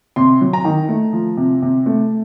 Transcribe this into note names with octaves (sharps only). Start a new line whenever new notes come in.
C3 C6
F#3
A#5
D#3
A3
F3
C3
C3
A3